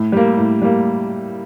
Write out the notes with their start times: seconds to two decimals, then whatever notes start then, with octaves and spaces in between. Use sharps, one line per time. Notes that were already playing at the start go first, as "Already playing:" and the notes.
Already playing: A2
0.12 G3 A#3
0.37 A2
0.62 G3 A#3